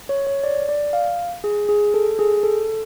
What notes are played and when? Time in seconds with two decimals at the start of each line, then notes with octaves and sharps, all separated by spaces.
0.09 C#5
0.26 C#5
0.44 D5
0.69 D5
0.93 F5
1.44 G#4
1.69 G#4
1.94 A4
2.19 G#4
2.43 A4